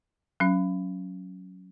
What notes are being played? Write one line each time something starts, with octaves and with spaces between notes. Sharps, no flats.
F#3 C#4